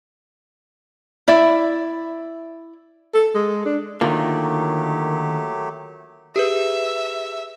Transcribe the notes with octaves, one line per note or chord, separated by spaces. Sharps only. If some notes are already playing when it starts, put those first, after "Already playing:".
E4 D5 E5
A4
G#3
D4
D3 D#3 F#3 A3 A#3 F4 G4
G4 G#4 B4 E5